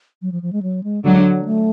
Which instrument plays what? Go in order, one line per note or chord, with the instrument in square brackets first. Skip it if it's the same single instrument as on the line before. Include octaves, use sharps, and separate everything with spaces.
[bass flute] F#3
F3
F3
G#3
F#3
G#3
[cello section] D3 F#3 [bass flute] G#3
[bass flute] F#3
A3